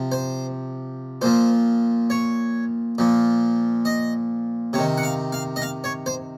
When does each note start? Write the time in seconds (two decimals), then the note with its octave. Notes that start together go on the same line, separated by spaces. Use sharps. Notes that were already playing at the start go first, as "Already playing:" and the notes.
Already playing: C3 F3
0.12 C5
1.21 A#2 F3 C5
2.10 C#5
2.98 A#2 F3
3.85 D#5
4.73 C3 C#5
4.78 D#3
4.98 F#5
5.03 F5
5.32 F5
5.56 D#5
5.62 F5
5.84 C#5
6.06 C5